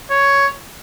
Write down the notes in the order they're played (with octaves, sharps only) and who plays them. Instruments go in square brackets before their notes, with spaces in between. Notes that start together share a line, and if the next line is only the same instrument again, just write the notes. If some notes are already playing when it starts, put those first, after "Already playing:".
[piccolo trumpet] C#5